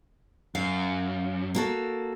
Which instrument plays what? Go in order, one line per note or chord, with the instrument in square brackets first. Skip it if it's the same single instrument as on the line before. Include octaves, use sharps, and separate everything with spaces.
[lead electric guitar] F#2 [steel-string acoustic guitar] F5
[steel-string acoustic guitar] A#3 F#4 A4